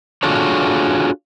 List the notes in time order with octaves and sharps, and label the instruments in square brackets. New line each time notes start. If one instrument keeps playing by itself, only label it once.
[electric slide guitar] D4 F4 F#4 G#4 A4 C#5